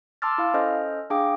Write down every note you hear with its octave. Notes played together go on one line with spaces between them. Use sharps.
A5 C6 D6 E6 F6 A6
E4 F5
C#4 A4 C5 D#5 F6
D4 G#4 F5 G5 D6